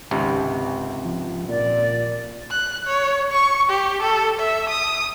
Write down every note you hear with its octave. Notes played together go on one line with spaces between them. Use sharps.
G#1 C#2 C3
F3
A#2 D5
F#6
C#5
C#6
G4
A4
E5
D#6